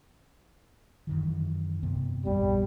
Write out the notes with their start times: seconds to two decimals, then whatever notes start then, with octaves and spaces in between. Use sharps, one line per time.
1.07 F#2 D#3 E3
1.83 G2 C3 B3
2.25 A#1 F2 G3 B3